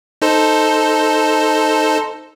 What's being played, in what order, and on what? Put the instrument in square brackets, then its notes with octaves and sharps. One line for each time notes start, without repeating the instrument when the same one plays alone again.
[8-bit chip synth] D#4 A4 C5